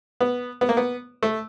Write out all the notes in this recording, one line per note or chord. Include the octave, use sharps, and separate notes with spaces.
B3
B3
A#3
B3
A3